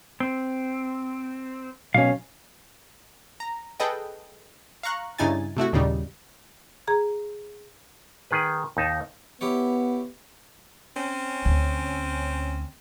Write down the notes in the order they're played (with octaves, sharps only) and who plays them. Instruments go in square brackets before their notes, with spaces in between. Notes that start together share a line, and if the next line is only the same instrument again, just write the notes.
[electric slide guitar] C4
[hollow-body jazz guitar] B1 C#4 [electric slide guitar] B2 F5
[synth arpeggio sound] A#5
G#4 A4 B4 D#5 G5
F5 A#5 C#6 F#6
G2 C#3 D#4 E4 G#5 A6
C3 A3 E4 F#4
D#2 A#2 C#3 G3 D#4
[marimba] G#4 A#5 G#6
[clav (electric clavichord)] D#3 G#4 B4
D#2 D#4 A5
[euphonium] B3 [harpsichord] E4 G4 C#5
[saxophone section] C4 C#4
[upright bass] D2